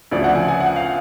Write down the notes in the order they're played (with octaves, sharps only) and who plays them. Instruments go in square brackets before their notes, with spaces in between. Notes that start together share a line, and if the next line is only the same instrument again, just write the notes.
[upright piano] D2 C#3 F3 D5
F#5
G#5
G#5
F#5
F5